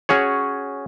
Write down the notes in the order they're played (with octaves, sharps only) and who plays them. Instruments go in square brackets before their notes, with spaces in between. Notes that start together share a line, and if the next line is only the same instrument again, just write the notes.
[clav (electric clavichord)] C#4 F#4 G#4 C#5